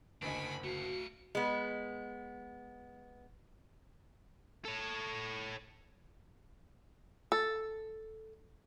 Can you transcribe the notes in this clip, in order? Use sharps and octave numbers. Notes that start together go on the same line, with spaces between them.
F#1 D2 D4 F#4 D#5 G#5 B5
A3 F#4 F5 C#7
G#3 B3
A4 C#5
A4